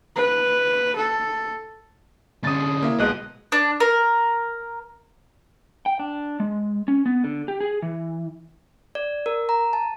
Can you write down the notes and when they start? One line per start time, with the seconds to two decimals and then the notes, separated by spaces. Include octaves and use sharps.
0.16 B4
0.96 A4
2.44 D3 C#4 D#6 A6
2.82 A#3 E4
2.99 B1 B2 G#3 D#5 D#6 F#6
3.52 D4
3.80 A#4
5.86 G5
5.99 D4
6.40 G#3
6.88 C#4
7.06 B3
7.24 D3
7.48 G4
7.61 G#4
7.82 E3
8.95 D5
9.26 A#4
9.49 A#5
9.73 A5